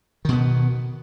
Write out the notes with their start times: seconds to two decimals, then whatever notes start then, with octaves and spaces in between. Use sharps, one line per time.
0.25 D#3
0.29 B2
0.32 B3